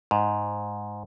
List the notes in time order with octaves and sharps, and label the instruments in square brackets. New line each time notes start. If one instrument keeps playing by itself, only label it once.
[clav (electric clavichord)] G#2